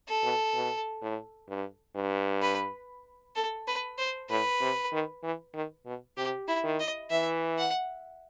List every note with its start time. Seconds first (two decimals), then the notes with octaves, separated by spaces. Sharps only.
0.08 A4
0.23 B2
0.54 B2
1.02 A2
1.49 G2
1.96 G2
2.42 B4
3.36 A4
3.67 B4
3.98 C5
4.29 A2 B4
4.61 C3
4.93 D#3
5.23 E3
5.54 D#3
5.86 B2
6.17 C3 G4
6.48 E4
6.64 D#3
6.80 D#5
7.11 E3 E5
7.58 F#5